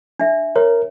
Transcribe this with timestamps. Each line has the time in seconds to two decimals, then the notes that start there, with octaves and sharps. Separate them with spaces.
0.20 D4 E5
0.56 A#4 C#5